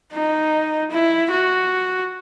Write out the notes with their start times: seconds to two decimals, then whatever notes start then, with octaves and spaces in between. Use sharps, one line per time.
0.13 D#4
0.91 E4
1.31 F#4